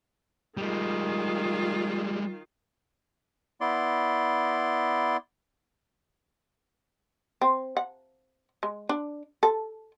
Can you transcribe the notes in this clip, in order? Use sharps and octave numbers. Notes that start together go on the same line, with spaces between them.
D#3 G3 G#3 F4
B3 E4 D5 C6
C4
F#5
G#3
D4
A4